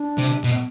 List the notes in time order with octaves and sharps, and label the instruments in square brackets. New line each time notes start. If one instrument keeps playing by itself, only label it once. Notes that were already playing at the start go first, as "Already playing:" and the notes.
Already playing: [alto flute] D4
[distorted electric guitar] C3
B2